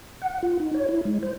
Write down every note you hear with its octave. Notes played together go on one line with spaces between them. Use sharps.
F#5
F4
D#4
C#5
E4
G#3
C5